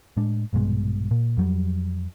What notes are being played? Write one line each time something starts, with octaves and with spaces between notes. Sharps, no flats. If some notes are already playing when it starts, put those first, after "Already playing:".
A2 G#3 D4
A#1 G2 B2 G#3
A#2
F2 F#3 G3